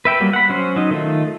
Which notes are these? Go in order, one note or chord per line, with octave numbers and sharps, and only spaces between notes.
B4 E5 G5 B5
F#3 G3 A#3
F#5 B5
F#3 C#4 C5
F#3 D#4
D#3 A3 F4